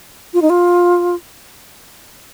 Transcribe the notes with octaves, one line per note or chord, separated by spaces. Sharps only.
F4
D#4
F4